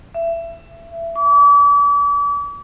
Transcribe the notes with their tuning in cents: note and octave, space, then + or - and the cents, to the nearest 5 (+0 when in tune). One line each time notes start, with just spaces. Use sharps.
E5 +25
D6 -40